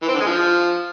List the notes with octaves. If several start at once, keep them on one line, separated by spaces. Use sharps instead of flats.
E3
C4
D3
G#3
F3